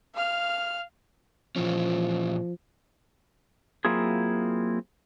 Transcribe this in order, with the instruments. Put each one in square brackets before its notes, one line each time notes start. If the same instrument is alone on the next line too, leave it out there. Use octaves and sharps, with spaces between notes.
[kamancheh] F5 F6
[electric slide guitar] A#2 E3 C#4 [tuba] F3
[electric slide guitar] F#3 A#3 C4 E4 F4 G#4